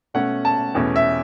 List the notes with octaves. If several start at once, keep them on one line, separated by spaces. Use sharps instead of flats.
B2 A3 C#4 F#5
A5
E2 B2 A3 C#4
E5